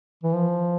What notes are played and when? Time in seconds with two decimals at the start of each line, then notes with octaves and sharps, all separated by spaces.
0.23 E3
0.34 F3